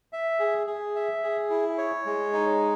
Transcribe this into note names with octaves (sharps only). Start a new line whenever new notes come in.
E5
G#4
G#4
E5
G#4
E4
C#5
G#3
D#4